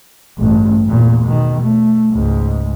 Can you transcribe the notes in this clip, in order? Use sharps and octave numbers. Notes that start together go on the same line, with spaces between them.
A1 G2
E2 A#2
B2 D#3
A3
C#2 G#2